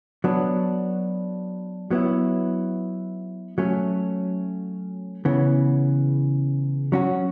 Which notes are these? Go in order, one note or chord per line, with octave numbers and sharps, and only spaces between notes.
F#3 B3 D4
F#3 B3 E4
F#3 A3 C#4
C#3 E3 B3
F#3 C#4 F#4